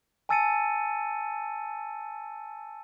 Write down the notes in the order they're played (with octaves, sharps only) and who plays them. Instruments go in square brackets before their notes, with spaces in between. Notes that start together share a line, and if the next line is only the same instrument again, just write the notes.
[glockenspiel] G#5 A5 E6 A6 C#7 D#7